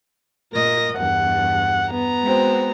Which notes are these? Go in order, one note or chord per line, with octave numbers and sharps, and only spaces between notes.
A#2 A#4 D#5 A#6
E2 G2 F#5
B3 A#5
G#3 C4 F#4